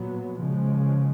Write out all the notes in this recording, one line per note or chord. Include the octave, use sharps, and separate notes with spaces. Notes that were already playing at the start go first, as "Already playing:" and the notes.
Already playing: A#2 F#3 B3
C#3 F3 G#3